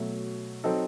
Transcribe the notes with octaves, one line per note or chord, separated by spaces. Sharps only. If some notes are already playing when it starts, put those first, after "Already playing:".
Already playing: B2 F#3 A3
F#3 C4 D#4 A4